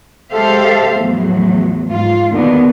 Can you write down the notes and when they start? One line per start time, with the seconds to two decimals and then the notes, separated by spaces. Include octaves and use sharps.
0.32 G#3 G4 A4 C5 E5 F5
0.96 E2 A2 F3 F#3
1.89 G#2 F4
2.32 D#2 B2 D3 D#3 B3